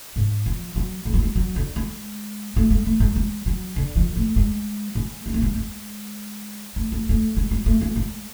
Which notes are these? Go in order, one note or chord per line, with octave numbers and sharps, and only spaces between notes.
G#2
F3
F#3
G#3
F#3
G#3
F#3
D3
G#3
A3
G#3
A3
G#3
G#3
F#3
D3
F3
A3
G#3
G#3
G#3
A3
G#3
G#3
A3
A3
A3
G#3
G#3
A3
G#3
G#3